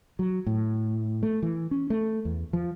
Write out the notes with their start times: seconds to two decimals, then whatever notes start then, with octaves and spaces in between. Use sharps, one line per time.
0.19 F#3
0.46 A2
1.23 A3
1.42 E3
1.71 C#4
1.90 A3
2.25 E2
2.53 F3